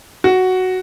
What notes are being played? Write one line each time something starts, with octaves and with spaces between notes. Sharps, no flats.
F#4